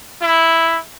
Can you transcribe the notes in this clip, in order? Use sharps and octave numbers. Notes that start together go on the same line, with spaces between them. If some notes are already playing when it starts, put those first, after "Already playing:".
E4